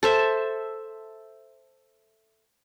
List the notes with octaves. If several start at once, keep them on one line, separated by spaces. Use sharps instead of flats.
A4 C5 E5